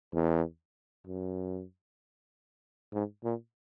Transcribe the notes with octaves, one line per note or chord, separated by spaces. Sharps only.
E2
F#2
G#2
A#2